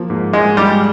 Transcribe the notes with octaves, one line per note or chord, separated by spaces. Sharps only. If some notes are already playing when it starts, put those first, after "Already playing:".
Already playing: F3 A#3
G#2
G#2 G#3
G3 G#3